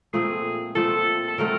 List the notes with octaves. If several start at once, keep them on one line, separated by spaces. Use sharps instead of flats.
A#2 F3 A3 C4 G#4
A#2 F3 A3 C4 A4
A4
D3 F#3 A3 C4 A#4